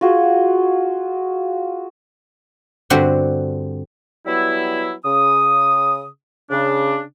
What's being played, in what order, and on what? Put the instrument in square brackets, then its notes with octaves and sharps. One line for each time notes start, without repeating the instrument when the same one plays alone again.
[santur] F4 F#4 G#4
[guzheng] G2 D3 C4 F#4 G4 F#5
[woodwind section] F#3 G3 B3 E4
C#3 D#6
C#3 D4